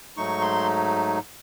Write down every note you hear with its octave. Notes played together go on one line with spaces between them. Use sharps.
G#2 F#3 A3 D#4 C#6
C6